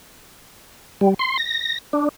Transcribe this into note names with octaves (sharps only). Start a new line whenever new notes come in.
G3
C6
A#6
D4